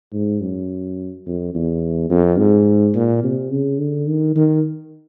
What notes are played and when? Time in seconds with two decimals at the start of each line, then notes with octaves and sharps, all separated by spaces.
0.13 G#2
0.41 F#2
1.26 F2
1.55 E2
2.10 F2
2.38 G#2
2.94 A#2
3.23 C3
3.51 C#3
3.79 D3
4.07 D#3
4.36 D#3